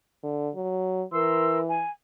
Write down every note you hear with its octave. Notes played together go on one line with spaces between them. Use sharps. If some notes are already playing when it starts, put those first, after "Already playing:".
D3
F#3
E3 A#4 C6 E6
G#5